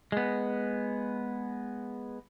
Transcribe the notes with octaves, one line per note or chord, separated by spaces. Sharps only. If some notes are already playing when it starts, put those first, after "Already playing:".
G#3 B3